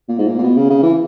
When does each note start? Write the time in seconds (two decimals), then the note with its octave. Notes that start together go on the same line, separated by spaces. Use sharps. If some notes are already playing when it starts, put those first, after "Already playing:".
0.08 A#2
0.18 G#2
0.27 A#2
0.38 A#2
0.43 B2
0.57 C#3
0.70 C#3
0.83 E3